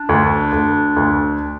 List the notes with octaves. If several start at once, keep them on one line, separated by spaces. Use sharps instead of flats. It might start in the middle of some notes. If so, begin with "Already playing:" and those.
Already playing: D4
D2
D2
D2